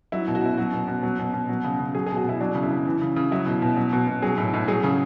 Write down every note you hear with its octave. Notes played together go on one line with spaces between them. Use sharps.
F#3 E4
B2
F#4
B2 E4
F#3 F#4
B2
B2
F#3
B2
B2
F#3
C#3
C#3
F#3 G#4
B2 G#4
F#4
B2 E4
F#3 D4
C#3
E4
C#3
E3
C#3
C#3
F#3 E4
B2
B2
F#3
B2
B2
F#3 G#4
A2
A2
F#3 G#4
C#3